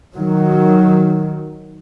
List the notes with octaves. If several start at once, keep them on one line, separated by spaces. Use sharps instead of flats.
D#3 F#3